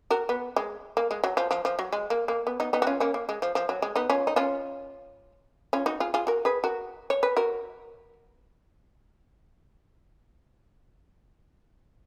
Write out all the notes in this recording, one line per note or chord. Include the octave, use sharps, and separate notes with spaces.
F#4 A#4
B3
G#3
A#3
G#3
F#3
F3
F3
F3
F#3
G#3
A#3
A#3
B3
B3 D#4
B3 D#4
F#4
C#4 F4
A#3 C#4
A#3
G#3
F3
F3
F#3
G#3
B3 D#4
C#4 F4
D#4
C#4 F4
C#4 F4
D#4 F#4
F4 G#4
F4 G#4
F#4 A#4
G#4 B4
F#4 A#4
C#5
B4
F#4 A#4